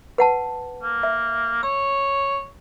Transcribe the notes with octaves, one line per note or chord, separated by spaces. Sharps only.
B4 F#5 A5
A#3
E5
C#5 E6